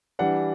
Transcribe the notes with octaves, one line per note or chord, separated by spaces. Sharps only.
E3 G3 D4 F#5